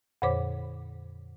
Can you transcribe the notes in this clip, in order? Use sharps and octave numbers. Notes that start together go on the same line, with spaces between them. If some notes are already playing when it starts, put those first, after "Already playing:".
F2 A#2 D3 C5 C#5 D6